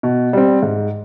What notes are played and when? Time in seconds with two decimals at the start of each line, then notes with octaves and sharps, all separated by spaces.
0.03 B2
0.33 G3 C4
0.62 G#2